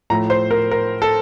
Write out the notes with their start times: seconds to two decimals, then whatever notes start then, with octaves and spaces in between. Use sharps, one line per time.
0.10 A2 F3 A3 A#5
0.30 C5
0.51 A#4
0.71 A#4
1.02 A4